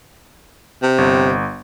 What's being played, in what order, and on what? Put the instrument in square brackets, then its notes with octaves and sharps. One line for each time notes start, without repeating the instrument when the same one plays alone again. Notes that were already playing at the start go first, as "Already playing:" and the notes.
[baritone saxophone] C3
[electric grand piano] G1